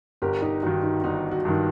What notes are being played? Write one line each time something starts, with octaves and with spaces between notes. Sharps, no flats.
G1 G4 A#4
D#4 G4
G2 D#3 F#4
D#4
G1 D#4
F#4
G2 D#3